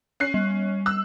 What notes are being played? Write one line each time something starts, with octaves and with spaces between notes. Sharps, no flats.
C#4 F#6 C7
G3
E6 F#6